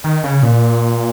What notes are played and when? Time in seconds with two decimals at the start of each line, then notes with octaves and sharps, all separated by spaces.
0.04 D#3
0.24 C#3
0.43 A#2